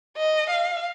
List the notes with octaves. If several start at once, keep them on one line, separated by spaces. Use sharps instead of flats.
D#5
F5